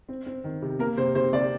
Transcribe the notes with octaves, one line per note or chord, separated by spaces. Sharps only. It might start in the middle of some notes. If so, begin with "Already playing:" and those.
C4
C4
D#3
C3
A#3 A#4
C3 C5
C3 C5
C3 D5